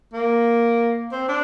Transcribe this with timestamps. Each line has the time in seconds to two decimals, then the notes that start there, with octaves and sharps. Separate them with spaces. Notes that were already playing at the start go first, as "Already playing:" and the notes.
0.13 A#3
1.12 C4
1.29 D4